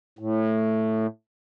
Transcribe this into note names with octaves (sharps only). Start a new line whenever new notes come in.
A2